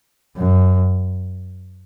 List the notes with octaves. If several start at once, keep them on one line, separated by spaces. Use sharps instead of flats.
F#2